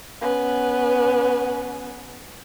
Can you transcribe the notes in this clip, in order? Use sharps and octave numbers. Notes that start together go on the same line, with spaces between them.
B3 C#4